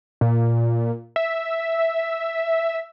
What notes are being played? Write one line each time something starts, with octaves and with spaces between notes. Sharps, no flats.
A#2
E5